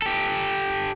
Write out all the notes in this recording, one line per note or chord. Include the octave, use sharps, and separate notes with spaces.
G4 A4